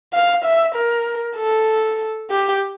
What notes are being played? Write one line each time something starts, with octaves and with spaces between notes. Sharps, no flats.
F5
E5
A#4
A4
G4